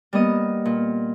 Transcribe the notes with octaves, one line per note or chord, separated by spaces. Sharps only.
G3 A#3 B3 D#5 D#6
A#2